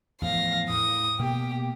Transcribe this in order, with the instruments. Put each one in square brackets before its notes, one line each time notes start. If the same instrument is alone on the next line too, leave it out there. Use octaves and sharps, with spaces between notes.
[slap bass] E2 A2 F3 [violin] F5 A#6
[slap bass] A2 [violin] D#6
[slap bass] B2 A#3 [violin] G4